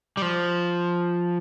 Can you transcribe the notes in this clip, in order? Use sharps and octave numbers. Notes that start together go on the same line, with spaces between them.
G3
F3